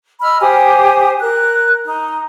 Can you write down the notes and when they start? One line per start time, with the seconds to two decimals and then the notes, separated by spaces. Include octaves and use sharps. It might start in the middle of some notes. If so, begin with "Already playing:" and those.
0.22 D#5 B5 E6 F6
0.41 G4 C5 G#5 D#6
1.21 A#4 F#6
1.85 D#4